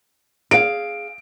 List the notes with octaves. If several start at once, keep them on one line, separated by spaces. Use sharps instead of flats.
G#4 F5 D7